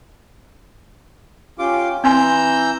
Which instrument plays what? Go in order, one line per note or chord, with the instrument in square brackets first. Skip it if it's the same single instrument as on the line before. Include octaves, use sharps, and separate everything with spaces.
[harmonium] C#4 G4 [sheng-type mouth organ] F4 D6
[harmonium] E3 [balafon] C4 G#5 C6 [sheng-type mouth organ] A#5 E6 G6